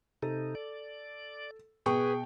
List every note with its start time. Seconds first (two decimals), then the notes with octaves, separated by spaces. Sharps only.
0.23 C3 D#4 A4
0.55 D5
1.86 B2 G#4 B4 G5 C#6